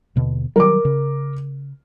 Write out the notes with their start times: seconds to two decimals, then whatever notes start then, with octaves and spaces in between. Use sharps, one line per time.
0.16 D#2 B2 D3
0.56 D#3 F#3 G3 A#4 D6
0.85 C#3